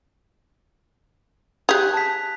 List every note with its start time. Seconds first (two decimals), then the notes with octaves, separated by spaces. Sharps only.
1.69 G4 G#4 F#6 F7
1.93 A5 B6